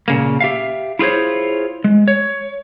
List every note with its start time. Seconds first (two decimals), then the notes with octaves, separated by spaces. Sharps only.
0.08 A#2 C#3 A#3
0.40 G4 E5 F5
0.99 E4 F4 G#4 C5 C#5
1.84 G#3
2.08 C#5